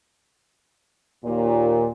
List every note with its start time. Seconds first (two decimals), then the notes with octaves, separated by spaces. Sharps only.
1.25 D#2 A#2